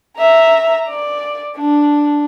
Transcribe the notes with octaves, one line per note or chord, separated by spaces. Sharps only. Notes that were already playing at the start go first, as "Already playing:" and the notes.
E5 A#5
D5
D4